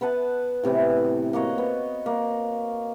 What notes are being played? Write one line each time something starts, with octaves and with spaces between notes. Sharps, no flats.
B3 B4 F#5 A5
A2 C3 E3 B3
A#3 F#4 C#5 D#5
B3
A#3